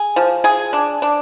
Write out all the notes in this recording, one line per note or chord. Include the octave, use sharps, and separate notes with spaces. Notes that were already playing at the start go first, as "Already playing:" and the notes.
Already playing: G#4
F3
G#4
D4
D4